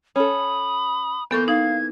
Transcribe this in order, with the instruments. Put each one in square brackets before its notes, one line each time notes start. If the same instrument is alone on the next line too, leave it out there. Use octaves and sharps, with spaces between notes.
[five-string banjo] C#4 A4 [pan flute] B5 [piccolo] D#6
[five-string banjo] E3 A#3 [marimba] B3 A4 C#6 [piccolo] G6
[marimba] D#4 [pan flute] F5 [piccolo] G#6